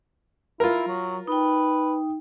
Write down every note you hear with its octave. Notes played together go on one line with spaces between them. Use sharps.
E4 F4 A#4
F#3
D#4 B4 G5